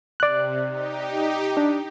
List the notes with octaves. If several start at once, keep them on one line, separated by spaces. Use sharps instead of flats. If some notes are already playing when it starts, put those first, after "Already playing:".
C3 D5 F#6
D#4 G4
D4